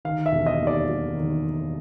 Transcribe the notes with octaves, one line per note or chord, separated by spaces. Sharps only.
D#3 F5
E5
E1
D#5
D#2
D5
F#3
D#3